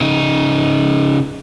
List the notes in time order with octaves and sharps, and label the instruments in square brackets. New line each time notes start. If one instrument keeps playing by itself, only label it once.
[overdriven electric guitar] C#3 D#4